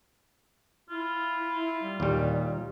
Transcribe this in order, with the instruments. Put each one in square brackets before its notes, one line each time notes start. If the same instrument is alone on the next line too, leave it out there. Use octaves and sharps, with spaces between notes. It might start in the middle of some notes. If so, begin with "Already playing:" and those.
[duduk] E4 [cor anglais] F4
[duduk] G3
[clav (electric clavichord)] D#2 G3 [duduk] A#2